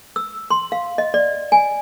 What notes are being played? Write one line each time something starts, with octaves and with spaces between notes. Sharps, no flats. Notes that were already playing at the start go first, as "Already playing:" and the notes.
E6
C6
F5
D#5
D5
G#5